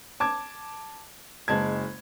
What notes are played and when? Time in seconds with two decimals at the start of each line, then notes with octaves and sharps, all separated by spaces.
0.20 A5 D6 G#6
1.48 F#1 G#3 A5 G#6